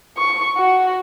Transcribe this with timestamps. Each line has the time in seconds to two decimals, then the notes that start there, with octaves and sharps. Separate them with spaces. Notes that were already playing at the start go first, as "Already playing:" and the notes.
0.18 C#6
0.58 F#4